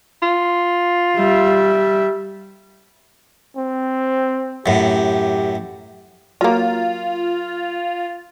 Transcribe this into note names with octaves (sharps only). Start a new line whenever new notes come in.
F4
G3 E5
C4
F#2 A2 G4
F#3 A#3 F4